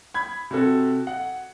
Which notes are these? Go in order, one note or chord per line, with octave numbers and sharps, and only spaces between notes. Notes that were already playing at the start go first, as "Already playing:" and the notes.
B5 G#6
C3 F#4 A4
F#5